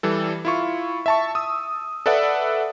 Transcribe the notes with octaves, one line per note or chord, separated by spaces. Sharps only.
E3 G3 A4
E4 F4 C#6
E5 A5 C#6
D#6 E6
A4 B4 D5 E5 F#5